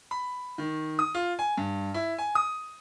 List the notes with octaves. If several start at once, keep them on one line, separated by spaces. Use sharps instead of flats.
B5
D#3
D#6
F4
G#5
G2
E4
G#5
D#6